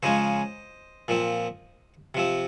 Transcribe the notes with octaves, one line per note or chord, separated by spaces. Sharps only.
C#3 F3 G#3 C#4 C5 D#5
A#2 F3 C4
C3 F3 C4